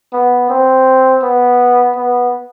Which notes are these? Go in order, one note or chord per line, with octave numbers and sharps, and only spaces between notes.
B3
C4
B3
B3